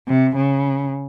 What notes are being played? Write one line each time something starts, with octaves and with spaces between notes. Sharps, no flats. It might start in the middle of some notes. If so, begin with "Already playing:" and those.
C3
C#3